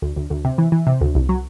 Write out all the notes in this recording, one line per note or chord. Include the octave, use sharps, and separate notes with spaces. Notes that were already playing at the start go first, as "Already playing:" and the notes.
D2
D2
D2
C3
E3
E3
C3
D2
C2
F#3